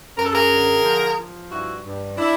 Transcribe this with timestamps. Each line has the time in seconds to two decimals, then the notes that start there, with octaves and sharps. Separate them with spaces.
0.17 F#2 A#4
0.25 A4
0.32 G#4 A#4
0.51 D3
0.84 F3
1.17 F3
1.51 G2 E4 F#4
1.84 G2
2.17 D4 E4